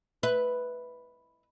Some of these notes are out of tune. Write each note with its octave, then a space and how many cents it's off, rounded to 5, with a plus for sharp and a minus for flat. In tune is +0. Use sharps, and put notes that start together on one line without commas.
B4 +0 E5 -15